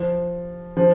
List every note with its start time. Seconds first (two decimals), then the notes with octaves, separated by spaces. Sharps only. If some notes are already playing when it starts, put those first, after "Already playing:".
Already playing: F3
0.77 F3